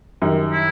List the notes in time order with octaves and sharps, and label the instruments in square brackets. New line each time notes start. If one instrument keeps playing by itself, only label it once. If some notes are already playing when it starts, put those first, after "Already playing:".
[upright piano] F#2 D#3 G3
[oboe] E4